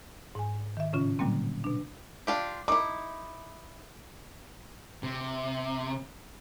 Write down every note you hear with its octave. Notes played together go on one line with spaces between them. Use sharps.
G#2 G#5
D#3 E5
A2 C#3 C#4 F4
A#2 D3 F#3 G3 A#3 C4
B2 D4
D4 F4 G4
D#4 E4 D6
C3